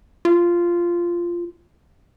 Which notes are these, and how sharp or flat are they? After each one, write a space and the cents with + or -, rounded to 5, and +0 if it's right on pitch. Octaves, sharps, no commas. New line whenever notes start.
F4 -10